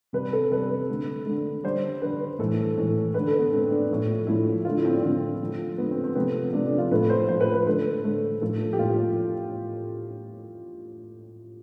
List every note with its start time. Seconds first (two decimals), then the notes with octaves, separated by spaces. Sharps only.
0.13 C3 G3 B4
0.33 A4
0.51 C3 G3 B4
0.89 D3 A3
1.26 D3 A3
1.64 D3 G3 C5
2.02 D3 G3 B4
2.39 A2 E3 A3 A4
2.77 A2 E3 A3
3.14 D3 A3 B4
3.27 A4
3.39 B3
3.52 D3 A3 C4
3.71 D4
3.90 A2 F3 A3
4.27 A2 F3 A3 E4
4.65 D3 F3 A3 F4
4.78 E4
4.85 C4
4.90 D4
5.03 D3 F3 A3 C4
5.41 D3 F3 A3
5.78 D3 F3 A3 B3
5.91 C4
6.04 C4
6.16 C3 F3 A3 B3
6.53 C3 F3 A3 D4
6.66 D4
6.78 F4
6.91 A2 F3 A3 B4
7.10 C5
7.29 A2 F3 A3 C5
7.41 B4
7.54 B4
7.66 D3 A3 B4
8.04 D3 A3
8.41 A2 F3 A3 A4
8.73 G4
8.79 A2 F3 A3 F4